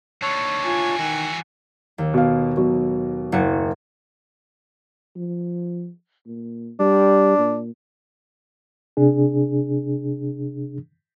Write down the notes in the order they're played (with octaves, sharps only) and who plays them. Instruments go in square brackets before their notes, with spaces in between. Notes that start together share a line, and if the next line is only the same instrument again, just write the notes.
[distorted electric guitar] D#2 D3 [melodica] C#5 A5
[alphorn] F4 [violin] G#5 G#6
[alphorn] D#3 [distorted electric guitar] E3 F#4
[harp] D#2
[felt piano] B2 F5
B2 F#3
[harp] F#1 F#4 C#7
[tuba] F3
A#2
[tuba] G3 [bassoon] D4
[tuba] A#2
[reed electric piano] C3 D4 G#4